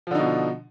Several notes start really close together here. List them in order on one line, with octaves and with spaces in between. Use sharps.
F3 D3 D#4 B2